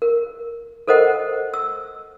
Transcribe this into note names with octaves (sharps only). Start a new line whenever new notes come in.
A#4
A4 A#4 C5 D#5 F#5
E6